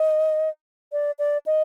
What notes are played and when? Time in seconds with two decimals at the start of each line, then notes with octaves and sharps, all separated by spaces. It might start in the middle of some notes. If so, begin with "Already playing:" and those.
Already playing: D#5
0.92 D5
1.19 D5
1.46 D#5